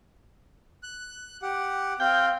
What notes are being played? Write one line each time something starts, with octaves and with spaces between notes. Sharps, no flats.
F#6
G4 F#5
C4 F5 G5